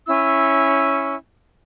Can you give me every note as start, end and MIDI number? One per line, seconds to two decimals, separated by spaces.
0.08 1.15 61
0.08 1.15 64
0.08 1.15 88